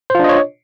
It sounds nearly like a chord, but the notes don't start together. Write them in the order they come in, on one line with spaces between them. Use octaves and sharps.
C5 F4 D4 D#5 C#5